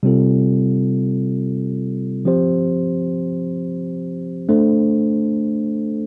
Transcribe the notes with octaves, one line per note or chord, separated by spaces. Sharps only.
C3 G3 C4 F4 A4
F3 C4 G4 C5
A3 D4 A4 C5